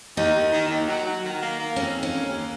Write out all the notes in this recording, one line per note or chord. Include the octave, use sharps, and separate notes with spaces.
D#2 D#4
D#2
D#3
D#2
F#3
F#3
D#3
A#3
A#3
F2 C#4
D#3
C#4
A#3
D#2